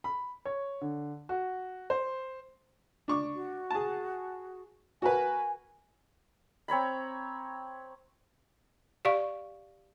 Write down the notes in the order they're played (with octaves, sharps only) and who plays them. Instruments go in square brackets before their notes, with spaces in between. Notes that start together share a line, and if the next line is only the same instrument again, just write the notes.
[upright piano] B5
C#5
D3
F#4
C5
[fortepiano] D4 C#6 D6
[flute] F#4
[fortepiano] G#4 A5
[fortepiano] F#4 A#4 B4 [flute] G#5
[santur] C4 C#5 A#5 B5
[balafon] G4 D5 F5 C#6